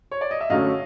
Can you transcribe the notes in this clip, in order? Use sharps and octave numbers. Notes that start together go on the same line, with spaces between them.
C#5
D5
D#5
E5
F#2 D3 F#3 A3 C#4 D#5 F5